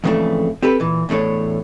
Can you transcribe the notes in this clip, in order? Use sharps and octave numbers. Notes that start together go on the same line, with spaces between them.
F2 G#2 C#3 E3 A3 D4
C4 G4 A4 B4
A#2 E3
E2 A2 A3 D4 C#5